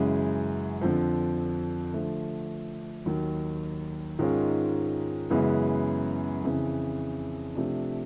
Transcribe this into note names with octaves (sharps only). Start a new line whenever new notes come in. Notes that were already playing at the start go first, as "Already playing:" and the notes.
Already playing: F#2 C#3 E3 G#3
F2 D3 F3
D3 F3 A3
D#2 D#3 F#3
G#2 D#3 G#3 C#4 F4
F#2 C#3 E3 G#3 B3
F2 C#3 E3
C3 F3 A3 D4